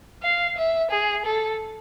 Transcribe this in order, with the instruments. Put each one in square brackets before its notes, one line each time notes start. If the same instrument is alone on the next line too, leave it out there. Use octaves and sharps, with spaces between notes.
[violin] F5
E5
G#4
A4